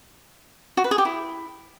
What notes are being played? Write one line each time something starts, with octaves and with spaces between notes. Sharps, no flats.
F#4
B4
G#4
G4
E4